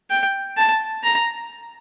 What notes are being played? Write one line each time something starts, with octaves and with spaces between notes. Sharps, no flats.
G5
A5
A#5